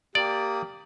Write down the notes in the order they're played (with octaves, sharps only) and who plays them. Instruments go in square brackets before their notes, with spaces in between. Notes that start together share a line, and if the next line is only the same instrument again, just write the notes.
[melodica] A#3 D#6 [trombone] G4 [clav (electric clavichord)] D5